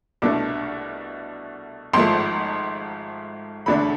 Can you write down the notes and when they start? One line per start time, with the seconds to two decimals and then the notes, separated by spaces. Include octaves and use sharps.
0.22 C2 B2 A3 D4 D6
1.94 G#1 G#2 F3 A3 C6
3.66 E1 D2 D3 A3 D4 B5